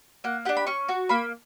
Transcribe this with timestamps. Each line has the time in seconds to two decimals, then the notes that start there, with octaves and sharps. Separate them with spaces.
0.24 A#3 F#5
0.45 D4 G4 F#5
0.57 B5
0.67 C#4 C#6
0.89 F#4
1.09 A#3 B5